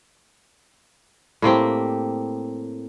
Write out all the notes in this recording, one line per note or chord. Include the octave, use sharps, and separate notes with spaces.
A2 A#3 C4 G4